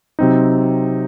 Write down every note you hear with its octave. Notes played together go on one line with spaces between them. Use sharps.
C3 F#3 C4 D#4